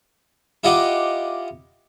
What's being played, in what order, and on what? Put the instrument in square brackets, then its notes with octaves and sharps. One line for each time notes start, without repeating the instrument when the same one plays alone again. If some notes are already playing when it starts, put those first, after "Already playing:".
[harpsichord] E4 F4 G4 D#5 F#5 D6